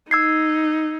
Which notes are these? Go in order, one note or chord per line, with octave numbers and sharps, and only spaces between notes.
D#4 E6 G#6 C7